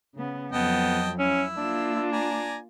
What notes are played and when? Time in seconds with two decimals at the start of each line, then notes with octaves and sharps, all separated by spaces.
0.15 C#3 B3
0.52 F2 F#3 B3 D#5 G5 A5
1.19 C#4 E4 E6
1.57 A#3 D4 F4
2.12 D5 G#5 A#5